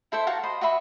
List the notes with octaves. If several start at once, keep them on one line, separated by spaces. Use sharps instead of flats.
E4 A4 C5 E5
F#4 F5 A5 A#5
C5 D#5 B5
F#4 D#5 E5 B5